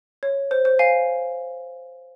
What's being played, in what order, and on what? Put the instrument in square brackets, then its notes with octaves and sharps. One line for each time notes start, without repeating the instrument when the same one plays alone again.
[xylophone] C#5
C5
C5
F5 G#5